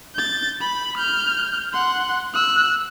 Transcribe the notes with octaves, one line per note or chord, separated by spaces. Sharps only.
G6 A6
B5
F6 G6
F#5 C6
E6 F#6